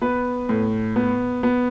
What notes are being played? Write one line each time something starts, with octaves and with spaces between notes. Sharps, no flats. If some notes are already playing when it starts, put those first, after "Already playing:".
B3 B4
A2
B3
B3